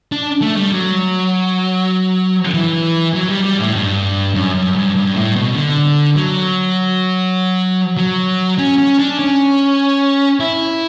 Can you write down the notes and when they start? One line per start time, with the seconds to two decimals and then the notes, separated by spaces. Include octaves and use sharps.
0.12 D4
0.42 A3
0.57 G3
0.71 F#3
2.54 E3
3.14 F#3
3.29 G3
3.44 G3
3.59 A2
3.74 G2
4.35 F#2
4.55 F#2
4.75 G2
4.96 G2
5.15 A2
5.36 B2
5.55 D3
6.16 F#3
7.97 F#3
8.58 C#4
8.78 C#4
8.99 D4
9.19 C#4
10.40 E4